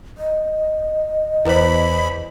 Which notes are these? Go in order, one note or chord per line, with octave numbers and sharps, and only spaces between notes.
D#5
E2 E4 B4 C5 B5